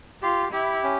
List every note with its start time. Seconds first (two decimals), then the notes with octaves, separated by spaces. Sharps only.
0.22 F4 G4
0.53 E4 G4
0.83 C#4